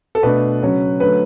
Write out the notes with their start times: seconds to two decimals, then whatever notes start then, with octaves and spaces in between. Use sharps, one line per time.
0.15 A4
0.23 B2 A3 D4 B4
0.62 C#3 F#3 C#4
1.00 D3 F#3 A3 B4